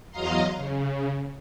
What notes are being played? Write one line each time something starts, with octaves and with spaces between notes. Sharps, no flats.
E2 F#3 D#5 F5 A#5 C6
C#3